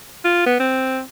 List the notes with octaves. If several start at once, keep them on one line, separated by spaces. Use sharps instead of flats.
F4
B3
C4